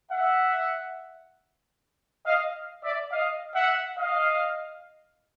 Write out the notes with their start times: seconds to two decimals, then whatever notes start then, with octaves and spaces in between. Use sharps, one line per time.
0.11 E5 F#5
2.26 D#5 F5
2.83 D5 E5
3.12 D#5 F5
3.54 E5 F#5
3.97 D#5 F5